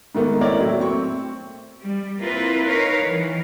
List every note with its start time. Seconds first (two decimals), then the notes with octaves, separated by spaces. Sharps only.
0.15 G#2 D#3 A3 B3
0.41 C4 E4 A#4 C#5 D5
0.60 A2 F#3 A3 E4
0.80 C4 C#6
1.83 G3
2.20 A#3 C4 E4 F4 B4
2.66 D#4 A#4 B4 C#5 F5
3.03 D#3 E3